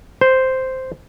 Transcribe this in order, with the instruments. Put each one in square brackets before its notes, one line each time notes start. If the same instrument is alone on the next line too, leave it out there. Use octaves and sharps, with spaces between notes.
[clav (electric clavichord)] C5